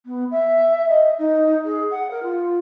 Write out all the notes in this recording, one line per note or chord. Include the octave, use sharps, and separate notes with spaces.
B3
E5
D#5
D#4
G#4
F#5
A#4
F4